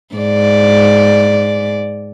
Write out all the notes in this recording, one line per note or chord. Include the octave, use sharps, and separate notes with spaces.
G#2 D5